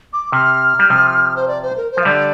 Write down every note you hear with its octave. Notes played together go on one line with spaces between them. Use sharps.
D6
C3 F6
G3
C3 F3
C5
D5
C5
A#4
C5
F3
F5
D3 G3 D5